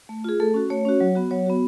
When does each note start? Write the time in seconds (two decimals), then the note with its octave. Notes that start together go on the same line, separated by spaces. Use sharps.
0.09 A3
0.24 F4 G#4
0.40 A3 A4
0.54 C#4 F#4
0.70 A3 C#5
0.85 C#4 F#4
1.00 F#3
1.15 B3 F#4
1.31 F#3 C#5
1.46 B3 F#4